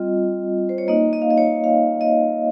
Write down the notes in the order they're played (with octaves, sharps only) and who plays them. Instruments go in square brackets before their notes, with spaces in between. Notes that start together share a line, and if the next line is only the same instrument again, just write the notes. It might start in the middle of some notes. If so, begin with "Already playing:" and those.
Already playing: [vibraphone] G3 C4 F4 D#5
C5
C#5
A#3 D#4 D#5
D#5
F5
D#5
C#5
F5
D#5